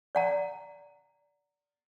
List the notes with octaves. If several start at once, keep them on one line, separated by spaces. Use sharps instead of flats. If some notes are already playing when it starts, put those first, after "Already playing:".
D5 F#5 A#5